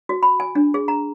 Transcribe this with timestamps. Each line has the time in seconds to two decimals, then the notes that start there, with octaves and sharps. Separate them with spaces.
0.09 F#4
0.23 B5
0.40 G#5
0.55 D4
0.74 G#4
0.88 A#5